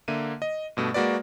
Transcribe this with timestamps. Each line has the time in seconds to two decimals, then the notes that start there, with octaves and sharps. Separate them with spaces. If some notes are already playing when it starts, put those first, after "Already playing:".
0.08 D3 A#3 E5 D#7
0.42 D#5
0.77 G2 B2 A3
0.94 G#3 A#3 F#4 B4 D5